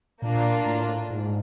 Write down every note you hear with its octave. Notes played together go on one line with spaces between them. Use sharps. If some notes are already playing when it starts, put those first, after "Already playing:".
A#2 A#3 D4 F4
A2
G#2